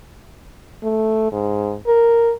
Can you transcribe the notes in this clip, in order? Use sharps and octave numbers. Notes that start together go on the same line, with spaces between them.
A3
G#2
A#4